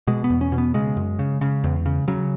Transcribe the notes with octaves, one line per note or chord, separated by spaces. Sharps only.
B2 G#3
B3
E2
C#4
B2
B3
C#3 G#3
F#2
C#3
C#3
E2
C#3
C#3 F#3